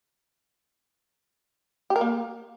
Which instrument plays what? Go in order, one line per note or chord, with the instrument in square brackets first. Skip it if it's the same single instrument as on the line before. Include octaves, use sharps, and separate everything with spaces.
[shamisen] G4
A#4
A#3